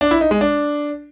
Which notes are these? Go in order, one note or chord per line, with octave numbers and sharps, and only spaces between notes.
D4
E4
D#4
G#3
D4